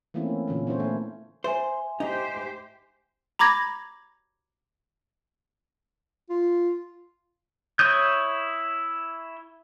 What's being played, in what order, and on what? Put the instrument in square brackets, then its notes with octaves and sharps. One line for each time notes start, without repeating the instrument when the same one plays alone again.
[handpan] E3 A3 A#3 C4 C#4 E4
A#2 D3 E3 C#4
B3 C#4 E4 C5 C#5
A3 A#3
[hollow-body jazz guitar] C5 [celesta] E5 G#5
[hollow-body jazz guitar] D#4 [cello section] G4 C5
[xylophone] A#5 B5 D6 G#6 A#6
[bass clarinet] F4
[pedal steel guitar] E4 C#5 D#6 G6